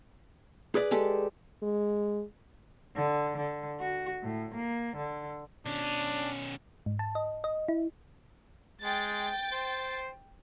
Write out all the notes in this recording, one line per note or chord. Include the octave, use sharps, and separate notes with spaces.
G#4 B4 D5
G#3 G4 A4
G#3
D3
D3
F#4
A2
A#3
D3
B2 C#4 D4
G#2
A5
D#5
D#5
E4
G#3 G5 A6
C5